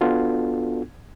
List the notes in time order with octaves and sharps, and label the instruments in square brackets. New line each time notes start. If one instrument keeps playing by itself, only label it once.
[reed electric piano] B3 D4 F4 F#4 A4